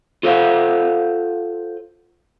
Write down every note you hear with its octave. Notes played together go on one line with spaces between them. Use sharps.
F4 A4 C5 D#5 F5 F#5